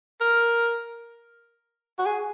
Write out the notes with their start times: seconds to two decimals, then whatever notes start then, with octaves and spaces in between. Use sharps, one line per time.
0.21 A#4
1.99 F#4
2.05 G#4